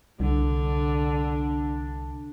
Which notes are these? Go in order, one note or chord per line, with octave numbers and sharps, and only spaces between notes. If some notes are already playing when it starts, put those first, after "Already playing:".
C2 D3 D4